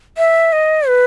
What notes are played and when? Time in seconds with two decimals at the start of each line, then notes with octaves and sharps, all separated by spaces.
0.18 E5
0.53 D#5
0.88 B4